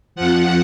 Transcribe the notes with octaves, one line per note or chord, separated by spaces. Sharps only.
F2 F3 F#5